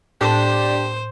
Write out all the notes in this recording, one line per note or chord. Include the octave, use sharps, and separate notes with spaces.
A2 D4 G4 C5